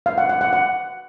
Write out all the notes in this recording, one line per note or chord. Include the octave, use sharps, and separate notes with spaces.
F5
F#5
F#5
F#5
F#5